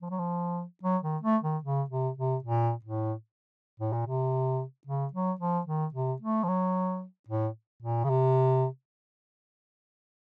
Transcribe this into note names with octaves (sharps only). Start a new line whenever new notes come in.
F3
F#3
F3
F#3
D#3
A3
D#3
C#3
C3
C3
A#2
A2
A2
A#2
C3
C#3
F#3
F3
D#3
C3
A3
F3
F#3
A2
A#2
C#3
C3